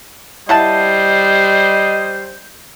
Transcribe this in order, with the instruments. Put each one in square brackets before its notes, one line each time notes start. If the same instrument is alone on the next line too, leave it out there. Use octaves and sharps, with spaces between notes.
[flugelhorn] G3 [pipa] E4 F#5 A5 [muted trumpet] C5 [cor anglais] D#5